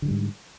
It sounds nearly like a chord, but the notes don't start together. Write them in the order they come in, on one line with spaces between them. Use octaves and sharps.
D3 D#3 G3 G#2